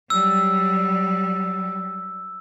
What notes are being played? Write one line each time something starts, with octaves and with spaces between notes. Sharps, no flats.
F#3 G3 E6